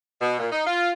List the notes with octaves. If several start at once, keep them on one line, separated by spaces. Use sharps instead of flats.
B2
A#2
D#4
F4